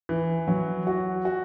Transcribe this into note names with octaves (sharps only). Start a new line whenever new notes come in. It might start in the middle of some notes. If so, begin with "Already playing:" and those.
E3
F#3
F#4
F#4